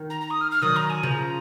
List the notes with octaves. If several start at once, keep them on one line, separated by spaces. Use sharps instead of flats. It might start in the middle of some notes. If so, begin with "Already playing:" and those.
Already playing: D#3
A#5
A#5
D#6
F6
F6
D#3 F#3 D#6
A#5
G#5
C#3 F3 A#5